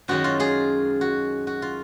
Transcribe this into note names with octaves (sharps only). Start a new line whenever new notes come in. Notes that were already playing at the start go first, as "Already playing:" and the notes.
F#2 D#3 G#3 C#4 F#4
F4
F4 G#4
F#4
F#4
F4